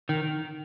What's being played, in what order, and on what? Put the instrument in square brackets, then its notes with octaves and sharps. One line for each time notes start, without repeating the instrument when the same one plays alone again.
[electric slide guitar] D#3